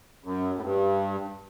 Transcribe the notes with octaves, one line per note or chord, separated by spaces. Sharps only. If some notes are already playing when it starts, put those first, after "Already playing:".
F#2
A2
G2